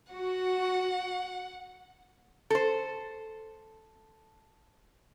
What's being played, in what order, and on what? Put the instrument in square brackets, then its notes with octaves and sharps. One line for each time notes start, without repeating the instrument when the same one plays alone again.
[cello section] F#4 [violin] F#5
[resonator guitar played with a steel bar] A4 C5